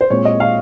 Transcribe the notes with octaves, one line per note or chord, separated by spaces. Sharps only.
C5
A#2 G#3 C4 C#5
D#5
F5